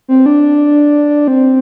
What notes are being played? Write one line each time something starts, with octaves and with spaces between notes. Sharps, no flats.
C4
D4
C4